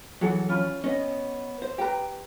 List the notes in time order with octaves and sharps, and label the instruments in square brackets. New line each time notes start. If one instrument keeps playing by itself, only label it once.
[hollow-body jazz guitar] E3 F#3 [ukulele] G#4 A4 F#5
[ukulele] C#4 F4 B5
[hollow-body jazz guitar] B3 C#4 [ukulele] D#5
[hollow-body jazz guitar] C5
[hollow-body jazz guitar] G4 A#5 [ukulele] B4 G5